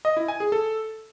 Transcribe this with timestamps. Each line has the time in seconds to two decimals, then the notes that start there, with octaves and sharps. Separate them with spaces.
0.05 D#5
0.17 E4
0.28 G#5
0.40 G#4
0.52 A4